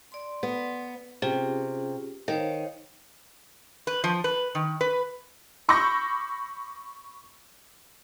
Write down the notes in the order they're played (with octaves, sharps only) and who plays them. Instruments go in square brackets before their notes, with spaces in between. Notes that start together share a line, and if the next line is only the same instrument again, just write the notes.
[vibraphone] D5 C6
[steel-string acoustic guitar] B3
[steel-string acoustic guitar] C3 [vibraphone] C#4 F4 G#4
[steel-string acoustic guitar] D#3 [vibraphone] C5 C#5 F5
[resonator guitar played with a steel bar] B4
F3
B4
D#3
B4
[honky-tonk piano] B5 C#6 D6 E6 G6 A#6